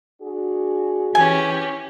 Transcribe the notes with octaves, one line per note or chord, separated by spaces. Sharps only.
D4 F#4 G#4
E3 C#4 G4 G#5